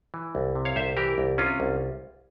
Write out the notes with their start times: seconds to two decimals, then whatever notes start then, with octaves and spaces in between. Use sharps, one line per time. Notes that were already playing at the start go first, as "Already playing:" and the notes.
0.14 E3
0.35 C2
0.55 C3
0.65 C#5 F5
0.76 C2 C5 E5
0.97 E3 G4 A#4
1.18 C2
1.38 C3 C#4 F4
1.60 C2